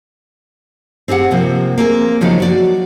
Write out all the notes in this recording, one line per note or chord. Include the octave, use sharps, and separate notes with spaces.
C4 G4 G#4 D#5 F#5
C3 F3 A#3
A#3 C4 G#4
C#3 F3 F#3 G#3 D#4
F#4 D5